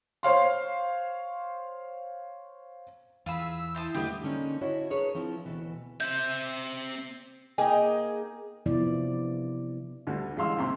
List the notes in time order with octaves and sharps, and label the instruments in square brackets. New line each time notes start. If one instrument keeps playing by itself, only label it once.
[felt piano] C5 C#5 F5 C6
[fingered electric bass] E2 [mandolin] F4 G#4 B5 [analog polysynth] E6
[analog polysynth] E4 [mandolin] C5 A5 D#6
[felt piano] D3 G3 A3 [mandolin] G4 B4 D#5
[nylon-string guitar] D3 G#3 A#3 C#4 D#4
D4 E4 F#4 C#5 D#5 E5
D4 G#4 A#4 B4 C#5
F3 C4 E4
D2 B2 E3
[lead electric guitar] C4 E5 [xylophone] G6
[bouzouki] A#3 D#4 G#4 G5
[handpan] C3 F3 B3 E4 D5
[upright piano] D2 D3 G3
A1 G#3 F5 C6 E6
D#2 C3 C6